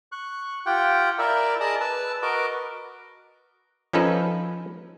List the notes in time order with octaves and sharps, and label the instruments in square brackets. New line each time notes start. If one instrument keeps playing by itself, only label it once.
[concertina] C#6 F#6
F4 G4 F#5 G5
E4 A#4 D5 E5
G#4 D5 D#5 A5 D#6
B4 A5 E6
F#4 A#4 B4 D#5 D6
[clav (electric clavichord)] F3 C#4 D#4 A4 B4